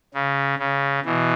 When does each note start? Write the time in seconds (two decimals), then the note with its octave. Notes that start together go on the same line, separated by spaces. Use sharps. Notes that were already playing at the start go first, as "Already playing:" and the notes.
0.14 C#3
0.59 C#3
1.05 B2 E3